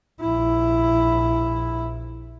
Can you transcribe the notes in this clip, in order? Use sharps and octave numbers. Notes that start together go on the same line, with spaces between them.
A#1 E4